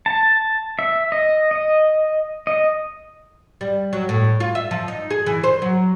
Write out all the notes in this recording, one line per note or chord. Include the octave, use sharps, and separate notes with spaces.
A5
E5
D#5
D#5
D#5
G3
F#3
A2
F4
E5
F3
D#4
G#4
E3
C5
F#3